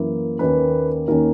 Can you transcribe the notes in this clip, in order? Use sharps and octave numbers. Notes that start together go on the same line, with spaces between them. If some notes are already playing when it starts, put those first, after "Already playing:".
Already playing: F#2 E3 A#3 E4
D#2 D#3 A#3 C#4 B4
D#2 D#3 A#3 C#4 A#4